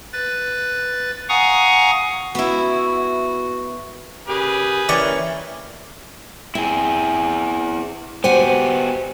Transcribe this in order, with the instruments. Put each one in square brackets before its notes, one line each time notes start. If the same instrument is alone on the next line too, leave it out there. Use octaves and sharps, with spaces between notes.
[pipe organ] B4 A6
F5 F#5 G#5 A#5 C#6 D#6
[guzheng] B3 E4 [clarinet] F#4
[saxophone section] C#3 A#3 G4 [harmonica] G#4 B4
[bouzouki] E3 [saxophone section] A#3 C#4 [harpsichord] D5 G5 C#6
[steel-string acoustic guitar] C4 [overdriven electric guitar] E4 G#4
[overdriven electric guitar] B3 G4 [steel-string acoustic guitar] F#4 F#5 G#5 [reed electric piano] C5